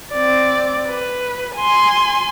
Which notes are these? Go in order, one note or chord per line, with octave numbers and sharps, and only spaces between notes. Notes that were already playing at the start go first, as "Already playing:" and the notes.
C4 D5
B4
G#5 C6